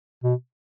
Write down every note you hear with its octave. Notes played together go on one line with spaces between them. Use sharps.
B2